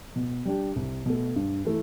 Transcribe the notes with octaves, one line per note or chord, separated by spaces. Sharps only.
B2
G3 D4 G4
C2
B2 A3
G2
E3 A3